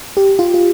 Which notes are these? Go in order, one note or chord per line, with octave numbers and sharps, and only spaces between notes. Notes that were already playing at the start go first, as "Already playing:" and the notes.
G4
F4
F4